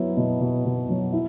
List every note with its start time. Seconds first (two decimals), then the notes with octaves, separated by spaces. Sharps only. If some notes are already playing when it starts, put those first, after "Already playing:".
Already playing: F#3 B3 E4
0.17 B2
0.41 B2
0.65 B2
0.89 F#3
1.13 E4